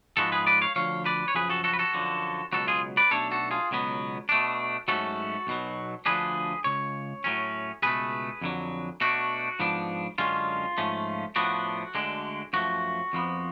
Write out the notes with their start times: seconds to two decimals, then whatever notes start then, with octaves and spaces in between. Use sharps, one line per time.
0.17 G#2 F3 G#3 B3 F#4 A4
0.32 G#4 B4
0.47 B4 D5
0.61 C#5 F5
0.76 D2 D3 F3 C#5 F5
1.05 B4 D5
1.28 C#5
1.35 F#2 C#3 F3 G#4 B4
1.49 F#4 A4
1.64 F#4 A4
1.73 B4
1.79 F#4 A4
1.94 F#2 D3 F3
2.52 C#2 B2 F#3 F#4 A4
2.67 F4 G#4
2.97 B4 D5
3.11 B1 B2 A3 D4 A4 C#5
3.32 F#4 A4
3.51 F4 G#4
3.71 C#2 B2 F#3 B3
4.29 B2 A3 D4
4.88 G#2 F#3 A3 C#4 F#4 A4
5.47 B1 B2 F#3
6.06 D2 D3 F3 G#3 D4 G#4 B4
6.64 C#2 C#3 C#5
7.24 A2 F#3 C#4
7.82 C#2 B2 A3 G#4 B4
8.41 F2 D3 F#3
9.01 B2 A3 D4 F#4
9.59 G#2 F3 B3 D4
10.18 F#2 D3 G#3 C#4 F4
10.78 G#2 F3 A3 C#4
11.36 A2 F3 B3 D4 F#4
11.95 D2 D3 G#3 D4
12.53 F#2 F3 A3 F#4
13.13 F2 F3 B3